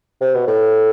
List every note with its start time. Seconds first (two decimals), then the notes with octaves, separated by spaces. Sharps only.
0.21 C3
0.34 B2
0.47 A2